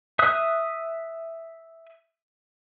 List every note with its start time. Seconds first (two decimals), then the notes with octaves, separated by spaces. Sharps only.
0.19 E5 D#6 F#6